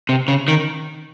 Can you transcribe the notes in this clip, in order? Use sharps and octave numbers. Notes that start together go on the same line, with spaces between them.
C3
C#3
D#3